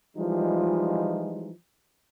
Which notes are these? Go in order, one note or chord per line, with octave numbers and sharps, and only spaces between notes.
E3 F3 G3 G#3 D#4 F4